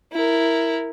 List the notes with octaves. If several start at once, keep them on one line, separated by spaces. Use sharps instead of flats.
E4 A#4